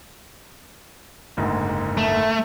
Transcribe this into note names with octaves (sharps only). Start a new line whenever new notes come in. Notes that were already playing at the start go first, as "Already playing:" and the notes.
F#1 D2 G#2
A3